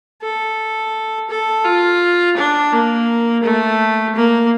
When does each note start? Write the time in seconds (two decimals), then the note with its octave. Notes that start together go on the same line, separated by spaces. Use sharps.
0.22 A4
1.30 A4
1.65 F4
2.37 D4
2.73 A#3
3.43 A3
4.16 A#3